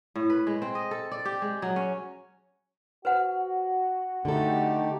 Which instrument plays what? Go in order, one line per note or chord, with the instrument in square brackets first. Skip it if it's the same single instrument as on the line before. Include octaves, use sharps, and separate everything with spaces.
[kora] A2
B4
G#3
C4
D#5
A4
D5
G4
G#3
F#3
C#4
[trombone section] F#4 [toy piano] B4 C5 F#5
[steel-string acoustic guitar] D3 A4 [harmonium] A3 D#4 G4